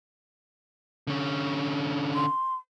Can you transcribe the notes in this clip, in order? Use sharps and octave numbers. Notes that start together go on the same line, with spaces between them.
D3 C#4
C6